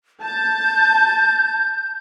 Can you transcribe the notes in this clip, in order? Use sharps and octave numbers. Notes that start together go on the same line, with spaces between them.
A5 G6